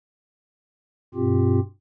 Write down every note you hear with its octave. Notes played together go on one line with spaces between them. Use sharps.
G2 B2 C4 F4 G4